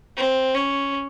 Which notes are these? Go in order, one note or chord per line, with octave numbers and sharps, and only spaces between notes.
C4
C#4